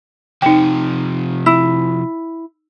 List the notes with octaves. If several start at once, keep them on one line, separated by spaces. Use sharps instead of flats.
C3 F3 D#4 G5
E4